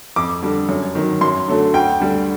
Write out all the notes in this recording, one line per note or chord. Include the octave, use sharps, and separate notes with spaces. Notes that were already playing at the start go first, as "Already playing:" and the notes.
F2 D6
D3 G3
F#2
D#3 F#3
F#2 C6
D3 F#3 A3
D2 G5
D3 G3